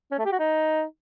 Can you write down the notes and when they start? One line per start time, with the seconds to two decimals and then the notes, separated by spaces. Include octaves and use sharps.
0.12 C#4
0.19 A3
0.25 G4
0.32 F#4
0.39 D#4